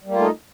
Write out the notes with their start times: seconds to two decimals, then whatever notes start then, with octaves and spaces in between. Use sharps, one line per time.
0.04 G3
0.08 A#3
0.12 F4
0.16 A3
0.20 D#4